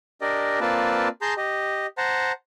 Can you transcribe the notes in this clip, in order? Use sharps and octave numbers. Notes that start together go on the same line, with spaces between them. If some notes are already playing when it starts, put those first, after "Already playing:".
D4 G4 A#4 D5 D#5
A#3 C4 F4 B4 D5 A5
G#4 A5 A#5 C6 G6
G4 D#5
C5 F#5 A5 A#5